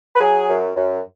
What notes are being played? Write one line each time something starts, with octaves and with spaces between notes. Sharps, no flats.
B4
F#3 G#4
F#2
F#2